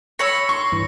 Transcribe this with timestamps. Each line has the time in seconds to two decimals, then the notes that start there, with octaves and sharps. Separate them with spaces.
0.19 C#5 B5 E6 A#6 C#7
0.49 C6 C#6
0.72 G2 E3